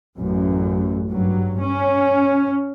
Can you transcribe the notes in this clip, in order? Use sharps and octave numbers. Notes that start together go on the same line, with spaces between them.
A1 F#2
G2 F#3
C#4